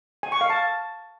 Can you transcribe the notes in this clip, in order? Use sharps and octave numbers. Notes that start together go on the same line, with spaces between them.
G#5
C#6
F5
A5